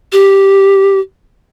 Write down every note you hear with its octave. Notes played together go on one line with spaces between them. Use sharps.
G4